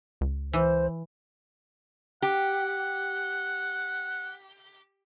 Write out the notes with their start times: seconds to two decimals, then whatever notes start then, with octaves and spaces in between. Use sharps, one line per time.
0.21 C#2
0.53 E3 C5
2.22 G4 F#5